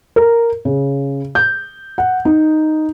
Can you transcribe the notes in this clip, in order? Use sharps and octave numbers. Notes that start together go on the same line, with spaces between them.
A#4
C#3
G6
F#5
D#4